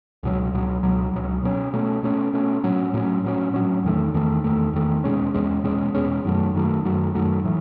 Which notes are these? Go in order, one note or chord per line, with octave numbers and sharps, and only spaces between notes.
C#2 B2 F#3
C#2 B2 F#3
C#2 B2 F#3
C#2 B2 F#3
B2 A3 C#4
B2 A3 C#4
B2 A3 C#4
B2 A3 C#4
A2 F#3 C#4
A2 F#3 C#4
A2 F#3 C#4
A2 F#3 C#4
E2 D#3 A3
E2 D#3 A3
E2 D#3 A3
E2 D#3 A3
E2 B2 G#3 C#4
E2 B2 G#3 C#4
E2 B2 G#3 C#4
E2 B2 G#3 C#4
F#2 D#3 F#3 A3
F#2 D#3 F#3 A3
F#2 D#3 F#3 A3
F#2 D#3 F#3 A3
A2 E3